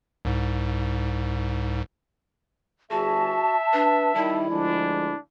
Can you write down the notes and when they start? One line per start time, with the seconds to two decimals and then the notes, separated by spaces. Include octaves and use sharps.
0.25 C2 G#2
2.91 G1 F#4 G#4 E5 A5
3.73 D4 B4
4.15 D#3 G3 E4
4.50 D2 F3 G#3 D4